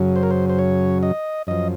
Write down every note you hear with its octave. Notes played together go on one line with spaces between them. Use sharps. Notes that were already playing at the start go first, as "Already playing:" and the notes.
Already playing: F#2 C#3 F#3
C5
A#4
C5
C5
C#5
D#5
F#2 F3 D#5